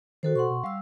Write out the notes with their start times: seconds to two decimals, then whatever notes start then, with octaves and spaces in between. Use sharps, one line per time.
0.23 D#3 F#4 A4 C5
0.35 B2 F#5 C6 C#6
0.50 B2
0.64 G3 F5 E6